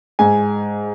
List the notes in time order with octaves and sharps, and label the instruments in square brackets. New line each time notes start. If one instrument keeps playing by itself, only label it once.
[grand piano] G#2 G#5